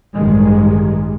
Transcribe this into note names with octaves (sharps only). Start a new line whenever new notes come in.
A1 G2 D#3 G#3